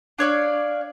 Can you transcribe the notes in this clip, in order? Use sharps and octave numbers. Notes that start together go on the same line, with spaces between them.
D4 C#5 D5 F5